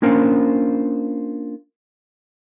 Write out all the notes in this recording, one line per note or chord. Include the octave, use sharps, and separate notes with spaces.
A#3 C#4 D4 F4 A#4 C5